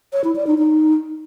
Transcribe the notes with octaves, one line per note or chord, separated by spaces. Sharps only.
C#5
E4
D5
D#4
D#4